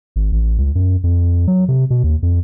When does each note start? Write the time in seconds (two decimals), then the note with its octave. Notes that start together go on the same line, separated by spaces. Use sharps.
0.16 G#1
0.32 A1
0.58 C#2
0.75 F#2
1.04 F2
1.47 F#3
1.68 C3
1.90 B2
2.04 D#2
2.23 F2